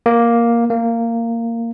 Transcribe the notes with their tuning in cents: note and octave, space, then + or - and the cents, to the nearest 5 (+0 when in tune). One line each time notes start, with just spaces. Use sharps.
A#3 +5
A#3 -15